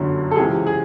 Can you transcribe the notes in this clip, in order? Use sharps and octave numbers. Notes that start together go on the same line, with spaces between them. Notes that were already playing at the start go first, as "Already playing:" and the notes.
Already playing: G1 F#2 D3 F#3
A4
C#2 C3 E3 G#4
G#4